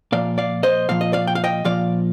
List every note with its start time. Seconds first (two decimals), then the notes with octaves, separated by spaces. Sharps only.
0.12 A#2 F3 D5 F5
0.38 D5 F5
0.63 C5 D#5
0.89 A#2 F3 F5
1.01 D#5
1.13 D5 F5
1.27 G5
1.35 F5
1.44 D#5 G5
1.65 A#2 F3 D5 F5